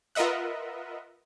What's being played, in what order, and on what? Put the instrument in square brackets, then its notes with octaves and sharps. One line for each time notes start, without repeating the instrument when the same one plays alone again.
[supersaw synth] F4 A#4 B4 D#5 E5 F#5